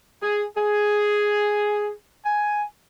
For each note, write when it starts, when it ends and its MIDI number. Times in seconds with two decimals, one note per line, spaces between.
0.22 0.44 68
0.57 1.91 68
2.25 2.63 80